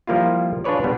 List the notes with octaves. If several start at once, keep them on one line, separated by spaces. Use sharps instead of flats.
F3 G3 A#3 E4 F4
D4 F4 G#4 B4 C#5 D5
B2 G3 B3